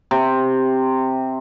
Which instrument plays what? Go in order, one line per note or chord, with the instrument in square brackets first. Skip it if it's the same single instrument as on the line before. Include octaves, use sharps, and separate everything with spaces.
[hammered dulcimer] C3